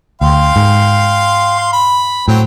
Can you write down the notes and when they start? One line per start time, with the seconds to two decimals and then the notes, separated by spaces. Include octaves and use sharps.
0.21 D2 F5 G5 C6
0.56 G#2
1.73 B5
2.28 A2 F#3 C4 G5